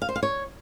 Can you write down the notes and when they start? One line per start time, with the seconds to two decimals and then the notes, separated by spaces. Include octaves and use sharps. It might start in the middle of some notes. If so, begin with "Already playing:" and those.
0.02 F5
0.09 C5
0.16 F5
0.23 C#5